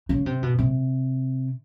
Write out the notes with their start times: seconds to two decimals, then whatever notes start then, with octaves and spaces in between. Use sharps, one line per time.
0.09 C#3
0.26 C3
0.42 B2
0.59 C3